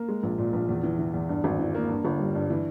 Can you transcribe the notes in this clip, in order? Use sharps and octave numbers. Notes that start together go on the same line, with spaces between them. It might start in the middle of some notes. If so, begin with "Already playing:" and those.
Already playing: A#3
G#3
A#1
A#2
A#1
E2
E3
E3
E2
G2
G#1
E3
A#3
G2
G1
G3
G2
E3